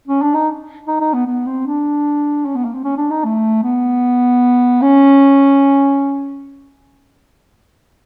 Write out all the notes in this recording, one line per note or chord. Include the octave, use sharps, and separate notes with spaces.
C#4
D4
D#4
D#4
D#4
B3
B3
C4
D4
C#4
B3
A#3
C4
C#4
D4
D#4
A3
B3
C#4